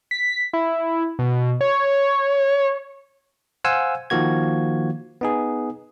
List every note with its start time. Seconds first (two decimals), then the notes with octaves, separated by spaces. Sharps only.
0.11 B6
0.53 E4
1.19 B2
1.61 C#5
3.64 C5 F5 F#5 G#5 E6
4.10 D#3 F3 A#3 F#4 G#6
5.21 B3 D#4 G#4